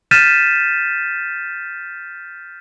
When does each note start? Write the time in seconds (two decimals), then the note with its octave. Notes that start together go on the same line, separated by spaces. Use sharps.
0.11 F6 G6 A6 B6 D#7 E7